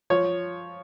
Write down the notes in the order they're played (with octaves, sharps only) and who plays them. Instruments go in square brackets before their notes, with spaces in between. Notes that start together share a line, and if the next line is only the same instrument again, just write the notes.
[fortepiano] F3 C#5